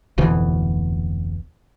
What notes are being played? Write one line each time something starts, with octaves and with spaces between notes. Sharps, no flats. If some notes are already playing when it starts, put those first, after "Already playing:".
F1 D2 B2 E3